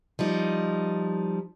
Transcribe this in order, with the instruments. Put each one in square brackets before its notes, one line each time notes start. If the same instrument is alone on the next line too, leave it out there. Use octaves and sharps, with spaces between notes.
[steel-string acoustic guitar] F3 G3 D#4